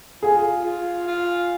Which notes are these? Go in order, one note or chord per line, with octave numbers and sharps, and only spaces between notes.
F4 G#4
F4
F4